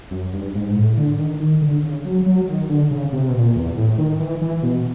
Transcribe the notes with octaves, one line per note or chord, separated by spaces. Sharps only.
F#2
G2
G#2
A2
D3
D#3
D#3
D3
C#3
F#3
F#3
D#3
D3
C#3
C3
B2
A#2
E2
A2
D#3
E3
E3
B2